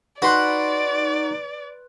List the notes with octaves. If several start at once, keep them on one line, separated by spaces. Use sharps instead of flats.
D#4 F#4 B4 D5 C6 F#6